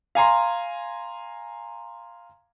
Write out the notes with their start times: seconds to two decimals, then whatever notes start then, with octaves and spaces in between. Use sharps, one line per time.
0.15 F5 G#5 A#5 C6